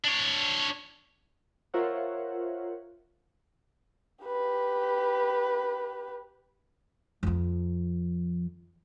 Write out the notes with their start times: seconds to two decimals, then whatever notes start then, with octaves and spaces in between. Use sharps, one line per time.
0.04 D4 C#5
1.74 F4 A#4 C5 C#5 E5 F#5
4.25 G4 B4
7.23 F2 F3